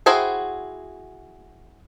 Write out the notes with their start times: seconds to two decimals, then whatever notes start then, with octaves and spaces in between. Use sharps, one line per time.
0.06 E4 F#4 G#4 C5 G5